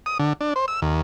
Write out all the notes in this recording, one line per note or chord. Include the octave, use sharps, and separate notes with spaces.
D#6
D3
D4
C5
E6
D#2